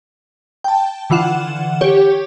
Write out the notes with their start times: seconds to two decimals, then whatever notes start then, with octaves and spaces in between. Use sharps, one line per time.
0.64 G5 A5
1.10 D3 E3 F4 F#5 E7
1.81 G4 C#5